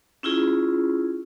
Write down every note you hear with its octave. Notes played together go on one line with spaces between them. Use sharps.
C#4 E4 F4 G#4